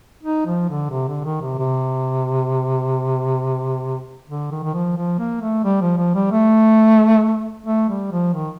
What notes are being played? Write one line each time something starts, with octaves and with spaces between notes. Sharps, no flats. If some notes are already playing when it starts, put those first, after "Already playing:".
D#4
F3
D3
C3
D3
D#3
C3
C3
D3
D#3
D#3
F3
F3
A#3
A3
G3
F3
F3
G3
A3
A3
G3
F3
D#3